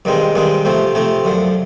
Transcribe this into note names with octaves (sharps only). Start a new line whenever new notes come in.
G2 D#3 G#3 C4
G2 D#3 G#3 C4
C3 F3 A3 C4
C3 F3 A3 C4
F#2 D3 F3